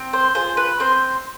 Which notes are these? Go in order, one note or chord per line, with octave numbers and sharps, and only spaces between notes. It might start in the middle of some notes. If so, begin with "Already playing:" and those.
Already playing: C4
C5
F4 G#4 C5
B4
C4 C5